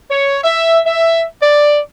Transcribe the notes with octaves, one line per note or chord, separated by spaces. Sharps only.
C#5
E5
E5
D5